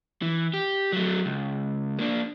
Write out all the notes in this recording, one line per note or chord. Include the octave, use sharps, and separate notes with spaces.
E3
G4
F#3 A3
C#2
A#3 D4